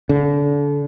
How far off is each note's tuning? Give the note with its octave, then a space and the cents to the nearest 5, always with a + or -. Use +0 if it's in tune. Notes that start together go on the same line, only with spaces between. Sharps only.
D3 -30